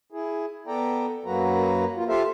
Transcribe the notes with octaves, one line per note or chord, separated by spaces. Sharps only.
E4 G#4
B3 A4 D5 G5 A#5
F#2 F#3 A#3 F#4 B4 A#5
A#3 F4
F4 G4 A4 C5 E5 F5